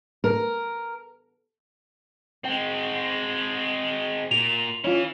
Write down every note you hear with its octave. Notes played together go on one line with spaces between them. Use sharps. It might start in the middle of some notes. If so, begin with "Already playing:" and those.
A#4
G#3 C4 G5
A#2 F7
E3 C#4 E4 F4